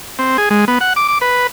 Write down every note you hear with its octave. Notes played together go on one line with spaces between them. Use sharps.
C4
G#4
G#3
B3
F#5
D6
D6
B4